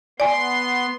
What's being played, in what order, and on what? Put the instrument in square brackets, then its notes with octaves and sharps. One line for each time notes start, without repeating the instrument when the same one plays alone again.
[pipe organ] B3 C6 [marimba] D5 G#5